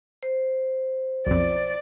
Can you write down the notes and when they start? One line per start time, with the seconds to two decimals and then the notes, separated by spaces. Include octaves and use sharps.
0.23 C5
1.27 B1 F2 D5